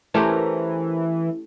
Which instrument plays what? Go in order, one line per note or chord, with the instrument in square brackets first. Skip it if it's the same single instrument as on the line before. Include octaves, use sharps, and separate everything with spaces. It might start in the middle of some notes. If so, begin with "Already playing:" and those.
[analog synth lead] E3 [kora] A3 C#4 G4 [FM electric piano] E4 [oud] A#4 C5